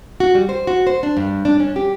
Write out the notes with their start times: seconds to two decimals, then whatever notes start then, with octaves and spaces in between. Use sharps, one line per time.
0.20 F#4
0.35 G3
0.49 C5
0.67 F#4
0.87 C5
1.03 D4
1.17 G2
1.45 D4
1.60 C#4
1.76 G4